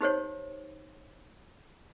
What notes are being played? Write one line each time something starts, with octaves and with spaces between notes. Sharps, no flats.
D#4 G4 C5 C#5